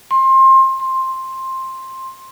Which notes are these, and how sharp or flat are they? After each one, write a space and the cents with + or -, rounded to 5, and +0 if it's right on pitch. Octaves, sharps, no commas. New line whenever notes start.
C6 +25
C6 +10